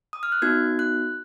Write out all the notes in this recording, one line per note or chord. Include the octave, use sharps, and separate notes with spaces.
D#6
F6
F#6
B3 D#4 F#4 G#6
F#6